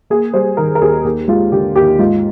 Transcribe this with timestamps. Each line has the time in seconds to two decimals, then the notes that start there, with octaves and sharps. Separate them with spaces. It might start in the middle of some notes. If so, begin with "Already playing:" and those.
0.10 A#3 G#4
0.34 G3 C5
0.57 D#3 A#4
0.75 A#4
0.81 D#2 G#4
1.04 D#2 G4
1.28 G#3 F4
1.52 D3 G4
1.76 D#2 G4
1.99 G#2 F4